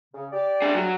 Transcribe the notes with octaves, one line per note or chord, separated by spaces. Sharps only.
C#3
G4 D5
D4 G#4
F#3